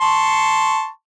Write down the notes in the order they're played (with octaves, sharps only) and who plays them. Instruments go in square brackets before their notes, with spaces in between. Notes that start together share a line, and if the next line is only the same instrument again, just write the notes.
[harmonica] A5 C6 C#6